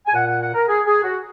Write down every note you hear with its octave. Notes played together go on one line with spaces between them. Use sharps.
G#5
A#2 F#5
F#5
F#5
A#4
G#4
G#4
F#4